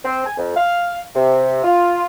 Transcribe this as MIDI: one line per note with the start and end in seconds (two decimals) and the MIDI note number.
0.05 0.24 60
0.26 0.37 80
0.38 0.55 41
0.56 0.99 77
1.15 1.64 48
1.64 2.06 65